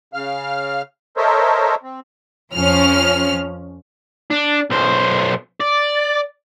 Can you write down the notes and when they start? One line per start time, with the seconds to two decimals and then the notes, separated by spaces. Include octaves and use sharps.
0.14 C#3 F5 F6
1.17 A4 A#4 C5 C#5 D#5 E5
1.83 C4
2.53 F2 F3 C#4 F6
4.31 D4
4.70 B1 C5
5.60 D5